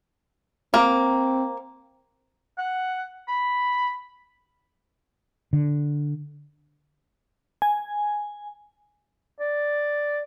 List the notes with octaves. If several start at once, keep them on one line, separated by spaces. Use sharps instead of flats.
A#3 C4
F#5
B5
D3
G#5
D5